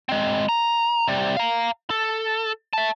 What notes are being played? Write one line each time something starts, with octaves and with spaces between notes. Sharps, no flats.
G#3 C4
A#5
C3 G3
F5 A#5
A4
E5 A5